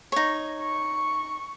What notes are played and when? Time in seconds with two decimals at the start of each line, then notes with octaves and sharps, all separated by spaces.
0.12 D#4 C#5
0.62 C#6